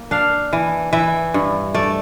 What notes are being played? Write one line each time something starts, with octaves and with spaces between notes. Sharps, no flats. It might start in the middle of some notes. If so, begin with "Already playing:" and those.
Already playing: A#3
D4 F5
E3
E3 E5
G2
A3 D5